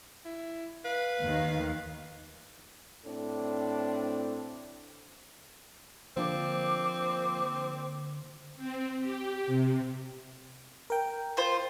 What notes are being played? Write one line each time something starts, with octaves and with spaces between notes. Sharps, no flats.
E4
B4 F5
D#2 D#3
A2 C4 D4 A4
D3 F3 A#3 C4 D6
C4
G4
C3
A#4 G5
F4 C5